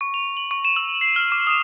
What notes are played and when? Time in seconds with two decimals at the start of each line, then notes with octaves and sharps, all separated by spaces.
0.01 C#6
0.14 F7
0.37 F#7
0.51 C#6
0.65 E7
0.76 E6
1.01 C7
1.16 F6
1.32 D6
1.47 D#6